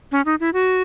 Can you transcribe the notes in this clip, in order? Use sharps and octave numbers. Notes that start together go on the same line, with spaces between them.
C#4
D#4
E4
F#4